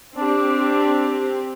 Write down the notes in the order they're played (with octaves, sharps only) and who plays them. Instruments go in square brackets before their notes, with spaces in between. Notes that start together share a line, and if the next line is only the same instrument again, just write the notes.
[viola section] C4 G4 [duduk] D4